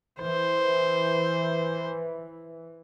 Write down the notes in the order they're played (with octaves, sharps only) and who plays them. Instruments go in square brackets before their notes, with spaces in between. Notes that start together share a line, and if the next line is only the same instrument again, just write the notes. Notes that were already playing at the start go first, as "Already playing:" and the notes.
[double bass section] E3 [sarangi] C5